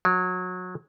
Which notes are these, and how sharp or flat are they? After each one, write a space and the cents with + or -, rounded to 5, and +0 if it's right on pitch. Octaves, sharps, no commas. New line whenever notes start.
F#3 -25